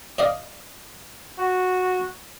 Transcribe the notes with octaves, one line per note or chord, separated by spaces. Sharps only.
D5 D#5 F5
F#4